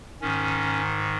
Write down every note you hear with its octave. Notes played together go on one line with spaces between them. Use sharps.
G#2 D#3 C#4